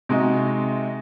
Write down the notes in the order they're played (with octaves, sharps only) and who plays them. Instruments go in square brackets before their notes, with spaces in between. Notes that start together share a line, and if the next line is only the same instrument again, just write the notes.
[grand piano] C3 G#3 D#4 F#4